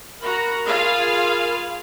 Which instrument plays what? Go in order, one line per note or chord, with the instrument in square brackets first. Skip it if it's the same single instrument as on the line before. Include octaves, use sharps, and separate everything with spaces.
[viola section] F#4 A#5 [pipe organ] A#4 B5
[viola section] F4 G#4 F5